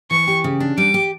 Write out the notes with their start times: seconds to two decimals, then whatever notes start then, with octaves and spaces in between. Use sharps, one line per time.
0.11 E3 C#6
0.28 G4
0.44 C#3
0.60 D4
0.78 G3 D6
0.94 G4